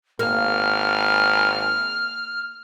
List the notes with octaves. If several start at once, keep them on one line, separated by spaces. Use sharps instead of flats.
G#1 A#3 F6